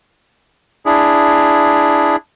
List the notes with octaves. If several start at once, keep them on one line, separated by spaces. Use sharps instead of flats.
D4 E4 G#4